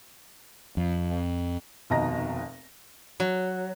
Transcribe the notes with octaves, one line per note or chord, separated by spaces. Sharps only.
F2
F1 D#2 B2 D#5 A#5 A#6
F#3